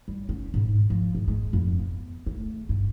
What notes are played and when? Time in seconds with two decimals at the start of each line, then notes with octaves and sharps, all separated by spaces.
0.08 G3
0.29 C#4
0.54 G#2
0.90 F3
1.15 G#2
1.28 G#3
1.53 F2
1.79 B3
2.27 A3
2.69 G2